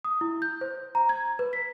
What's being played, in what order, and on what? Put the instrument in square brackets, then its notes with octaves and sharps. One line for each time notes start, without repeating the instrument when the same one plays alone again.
[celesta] D#6
E4
G6
C5
A#5
G#6
B4
B6